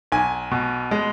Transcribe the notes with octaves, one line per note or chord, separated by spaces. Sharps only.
B1 G#5
B2
G#3